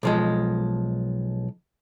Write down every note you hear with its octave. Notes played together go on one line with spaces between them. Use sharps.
B1 F3 G#3